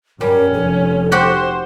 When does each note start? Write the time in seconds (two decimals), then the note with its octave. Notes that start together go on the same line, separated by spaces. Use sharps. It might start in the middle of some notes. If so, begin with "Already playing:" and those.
0.21 F#2 G3 C#4 A#4
0.54 F1 A4
1.12 F#4 G4 C5 F#5